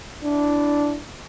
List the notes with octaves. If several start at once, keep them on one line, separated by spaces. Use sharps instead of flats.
D4 E4